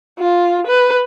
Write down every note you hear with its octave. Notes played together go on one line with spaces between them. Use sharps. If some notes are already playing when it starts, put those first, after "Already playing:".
F4
B4